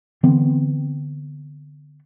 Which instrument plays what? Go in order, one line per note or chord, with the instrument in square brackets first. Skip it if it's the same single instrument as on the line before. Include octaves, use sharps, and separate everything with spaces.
[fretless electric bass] D3 E3 B3 C4